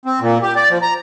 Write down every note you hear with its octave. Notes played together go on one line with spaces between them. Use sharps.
C4
A#2
G4
D5
F3
A#5